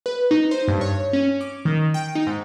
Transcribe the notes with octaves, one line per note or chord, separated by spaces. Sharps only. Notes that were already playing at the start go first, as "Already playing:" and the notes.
B4
D#4
C5
G2
C#5
C#4
D6
D#3
G5
D#4
G#2